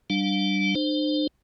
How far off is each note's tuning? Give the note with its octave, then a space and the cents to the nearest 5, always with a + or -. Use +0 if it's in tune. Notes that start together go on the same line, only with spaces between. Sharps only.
G3 -20 D4 +10 F5 +30
D4 +45 C5 +0